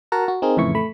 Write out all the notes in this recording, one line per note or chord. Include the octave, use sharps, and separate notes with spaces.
F#4 A#4 F#5 A5 A#5
F#4
C4 D#4 G#4 A#4
F2 A2 C#3 E3 E4 C#6
A3 B5